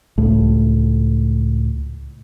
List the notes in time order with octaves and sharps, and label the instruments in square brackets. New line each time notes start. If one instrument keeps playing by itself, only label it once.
[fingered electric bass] C#2 A2